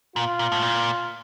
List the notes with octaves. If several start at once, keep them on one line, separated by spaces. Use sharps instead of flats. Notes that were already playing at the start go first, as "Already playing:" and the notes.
A#2 F4
A#2
A2
A#2